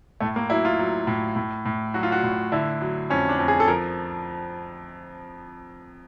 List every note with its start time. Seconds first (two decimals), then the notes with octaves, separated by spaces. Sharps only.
0.21 A2 A3
0.36 A#3
0.50 F#3 E4
0.65 F4
0.79 F#3
1.07 A2
1.36 A2
1.65 A2
1.94 F#3 F#4
2.03 F4
2.12 F#4
2.23 A2
2.52 D3 E4
2.81 F#3
3.10 F2 C#4
3.29 D4
3.39 F2
3.48 G#4
3.60 A4
3.68 F3 A#4